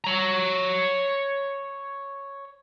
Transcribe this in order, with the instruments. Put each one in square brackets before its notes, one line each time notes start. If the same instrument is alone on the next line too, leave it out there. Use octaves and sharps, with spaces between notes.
[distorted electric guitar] C#5 A#5